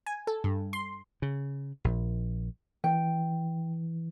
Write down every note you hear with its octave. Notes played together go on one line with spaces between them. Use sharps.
G#5
A4
G2
C6
C#3
A#1
E3 G5